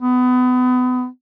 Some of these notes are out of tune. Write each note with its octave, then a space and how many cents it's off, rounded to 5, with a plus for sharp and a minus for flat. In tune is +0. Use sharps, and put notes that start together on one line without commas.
B3 +30